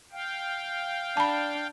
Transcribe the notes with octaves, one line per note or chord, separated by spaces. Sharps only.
F5 G5
D4 A5 B5